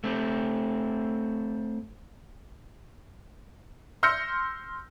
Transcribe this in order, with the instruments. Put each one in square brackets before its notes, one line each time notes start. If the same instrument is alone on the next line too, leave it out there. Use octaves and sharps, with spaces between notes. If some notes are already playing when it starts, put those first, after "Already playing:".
[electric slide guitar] A3 C4
[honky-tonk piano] C6 E6 F6 G6 A#6 C#7